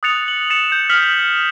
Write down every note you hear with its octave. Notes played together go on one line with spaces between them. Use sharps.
D#6 F#6 A6 C#7 F7
F#7
A6 C#7 E7
G6
D#6 F6 B6 F7 F#7